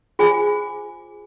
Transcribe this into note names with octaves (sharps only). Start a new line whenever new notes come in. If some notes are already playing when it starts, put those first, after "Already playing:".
F4 G#4 C5 G#5 D6